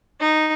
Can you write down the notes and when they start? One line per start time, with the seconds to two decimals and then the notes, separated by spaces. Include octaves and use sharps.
0.20 D#4